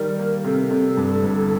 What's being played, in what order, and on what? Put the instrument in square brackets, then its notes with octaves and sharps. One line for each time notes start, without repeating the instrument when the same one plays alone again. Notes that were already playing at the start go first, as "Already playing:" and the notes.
Already playing: [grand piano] D#3 G3 [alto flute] A#4
[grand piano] A#3
[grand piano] C3 [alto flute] A4
[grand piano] C3
G2
G1